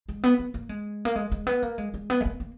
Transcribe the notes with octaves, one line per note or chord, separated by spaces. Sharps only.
G#3
B3
B3
A#3
G#3
A#3
G#3
G#3
B3
A#3
G#3
G#3
B3
G#3
A#3
A#3